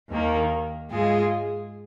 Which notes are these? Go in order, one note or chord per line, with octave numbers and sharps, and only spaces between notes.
D#2 D#3 A#3
G#2 G#3 F4 G#4